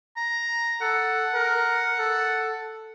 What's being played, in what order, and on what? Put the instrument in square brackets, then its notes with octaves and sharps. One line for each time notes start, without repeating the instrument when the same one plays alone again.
[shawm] A#5
[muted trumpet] A4 [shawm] F#5
[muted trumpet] A#4
A4